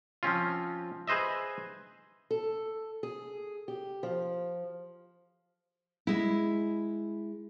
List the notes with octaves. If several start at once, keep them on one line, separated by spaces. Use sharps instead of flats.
F3 C4 C#4 F4
G#4 B4 C5 D#5 E5
A4
G#4
G4
F3
G#3 E4